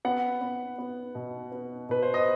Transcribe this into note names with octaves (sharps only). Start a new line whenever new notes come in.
B3 F#5
B3
B3
B2
B3
B2 B4
C5
D#5